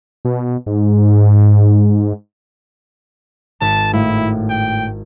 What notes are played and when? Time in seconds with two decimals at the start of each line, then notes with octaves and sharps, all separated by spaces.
0.25 B2
0.66 G#2
3.61 G#1 A5 B6 C#7
3.93 A2 E4 F5
4.49 G5